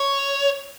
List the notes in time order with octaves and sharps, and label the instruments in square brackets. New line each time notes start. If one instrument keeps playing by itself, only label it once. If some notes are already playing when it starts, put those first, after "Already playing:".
Already playing: [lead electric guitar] C#5